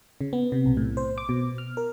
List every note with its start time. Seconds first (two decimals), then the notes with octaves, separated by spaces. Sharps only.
0.21 C#3
0.33 B3
0.52 C3
0.66 B1
0.77 A2
0.97 C5
1.18 D6
1.29 B2
1.58 F6
1.77 A#4